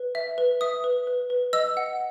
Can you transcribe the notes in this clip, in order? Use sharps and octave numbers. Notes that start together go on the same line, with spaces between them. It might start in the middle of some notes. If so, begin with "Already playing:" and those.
Already playing: B4
E5
B4
E5 D#6
B4
B4
B4
D#5 E6
F#5